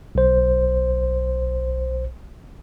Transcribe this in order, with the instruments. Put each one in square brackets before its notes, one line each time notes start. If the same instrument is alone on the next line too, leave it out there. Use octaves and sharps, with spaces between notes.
[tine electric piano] B1 C5